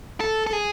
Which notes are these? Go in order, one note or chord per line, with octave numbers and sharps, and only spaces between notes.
A4
A4
G#4